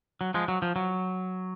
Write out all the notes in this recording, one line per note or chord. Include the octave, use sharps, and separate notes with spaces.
F#3
F3 G#3
F#3
F3
F#3